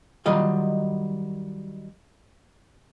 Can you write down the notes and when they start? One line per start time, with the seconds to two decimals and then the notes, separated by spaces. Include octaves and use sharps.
0.26 D#3 F#3 G3 F4 D#5 F5